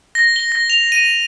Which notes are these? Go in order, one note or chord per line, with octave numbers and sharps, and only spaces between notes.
A#6
G7
A#6
F7
D#7